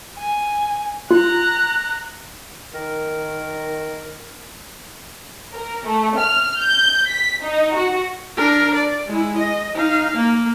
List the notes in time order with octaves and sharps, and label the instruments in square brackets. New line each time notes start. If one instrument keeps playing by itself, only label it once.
[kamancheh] G#5
[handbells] F4 [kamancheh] A#5 F#6
[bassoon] D#3 [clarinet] A#4
[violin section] A#4
A3
F6
G6
B6
D#4
F#4
[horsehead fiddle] D4 A#4
D5
G#3 E4
D#5
D#4 F5
A#3